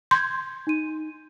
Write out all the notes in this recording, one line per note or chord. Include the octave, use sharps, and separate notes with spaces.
C6 G6 G#6
D#4 D#7